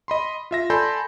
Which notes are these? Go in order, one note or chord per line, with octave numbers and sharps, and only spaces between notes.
D#5 B5 C6
F4 E5 A#6
A4 D5 G#5 B5 C6 G6